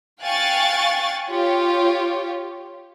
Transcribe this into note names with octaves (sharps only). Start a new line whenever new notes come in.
F5 G5 G#5 C#6 F#6 A6
F4 G4 C#5